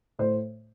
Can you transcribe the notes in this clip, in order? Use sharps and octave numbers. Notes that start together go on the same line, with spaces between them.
A2 C5